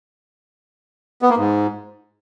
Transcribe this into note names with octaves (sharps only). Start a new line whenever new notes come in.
B3
A#3
G#2